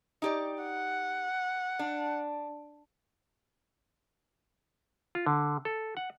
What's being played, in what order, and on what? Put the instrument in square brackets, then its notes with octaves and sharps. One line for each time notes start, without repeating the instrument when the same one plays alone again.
[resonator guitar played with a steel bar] D#4 G4 D5
[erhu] F#5
[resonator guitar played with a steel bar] D4
[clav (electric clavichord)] F4
D3
A4
F#5